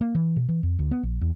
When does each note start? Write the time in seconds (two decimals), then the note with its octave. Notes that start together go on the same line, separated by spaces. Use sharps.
0.01 A#3
0.15 E3
0.36 B2
0.49 E3
0.63 F2
0.79 D2
0.91 B3
1.03 A#1
1.21 E2